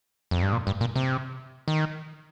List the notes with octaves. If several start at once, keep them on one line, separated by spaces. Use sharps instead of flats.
F2
G2
A#2
G2
A#2
C3
D#3